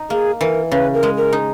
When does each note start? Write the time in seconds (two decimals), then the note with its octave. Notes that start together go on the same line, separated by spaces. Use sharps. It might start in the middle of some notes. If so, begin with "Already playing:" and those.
Already playing: D#4
0.10 A#3 G#4
0.41 E3 A#4
0.71 C#3 B4
0.94 A#4
1.03 G#3
1.17 A#4
1.33 D#4